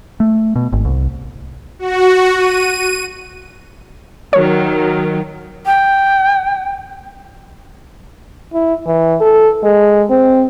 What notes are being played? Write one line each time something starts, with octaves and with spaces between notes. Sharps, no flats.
A3
B2
G#1
C2
F#4
D#7
D#3 F#3 C#5
G5
E4
E3
A4
G#3
C4